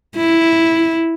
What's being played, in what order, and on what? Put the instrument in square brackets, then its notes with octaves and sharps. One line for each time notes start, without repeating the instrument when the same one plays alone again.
[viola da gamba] E4